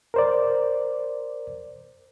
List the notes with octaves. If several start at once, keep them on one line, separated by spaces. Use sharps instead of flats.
A#4 C5 D5